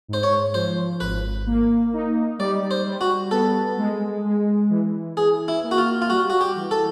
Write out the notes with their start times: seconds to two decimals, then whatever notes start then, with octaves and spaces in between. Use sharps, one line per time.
0.08 G#2
0.13 C5
0.23 C#5
0.54 F3 C5
1.00 G#1 B4
1.46 A#3
1.93 D#4
2.39 G3 D5
2.71 C5
2.86 G3
3.01 F#4
3.31 B3 A4
3.78 G#3
4.25 G#3
4.70 E3
5.17 E3 G#4
5.48 E4
5.64 A#3
5.71 F#4
5.78 F4
6.02 F4
6.10 G3 F#4
6.30 F#4
6.41 G4
6.56 E3
6.71 A4